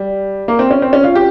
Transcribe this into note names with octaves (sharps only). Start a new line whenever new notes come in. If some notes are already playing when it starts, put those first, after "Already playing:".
Already playing: G3
A#3
C4
C#4
C4
C#4
F4
G4